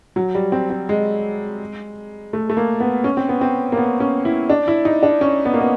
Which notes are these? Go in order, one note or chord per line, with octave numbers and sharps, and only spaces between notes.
F#3
G3
C4
C4
G#3
A3
A3
A#3
B3
C#4
C4
B3
C4
A#3
B3
C#4
E4
D4
E4
D#4
D4
C#4
B3
A#3
B3